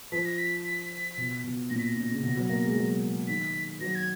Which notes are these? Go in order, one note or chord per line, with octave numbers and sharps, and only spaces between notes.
F3 B6
A#6
B6
B6
B2
B2
A#2 A#6
B6
A#6
A#2
C#3
B2
F#3
A#3
G#3
F#3
D#3 B6
F#3 A#6
G#6